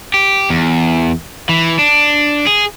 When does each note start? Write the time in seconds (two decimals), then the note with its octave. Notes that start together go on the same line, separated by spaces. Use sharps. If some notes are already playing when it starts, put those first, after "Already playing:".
0.14 G4
0.50 E2
1.49 E3
1.79 D4
2.47 G#4